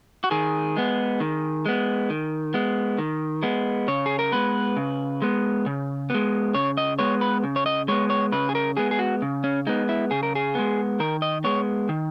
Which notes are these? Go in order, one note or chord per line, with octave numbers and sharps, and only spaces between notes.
F#4
D#3 G#4
G#3 B3
D#3
G#3 B3
D#3
G#3 B3
D#3
G#3 B3
C#3 C#5
G#4
A#4
G#3 B3 B4
C#3
G#3 B3
C#3
G#3 B3
C#3 C#5
D#5
G#3 B3 C#5
B4
C#3
C#5
D#5
G#3 B3 C#5
C#5
C#3 B4
G#4
A#4
G#3 B3 G#4
G#4
F#4
C#3
C#4
G#3 B3 D#4
E4
C#3 G#4
A#4
G#4
G#3 B3
D#3 A#4
D#5
G#3 B3 C#5
D#3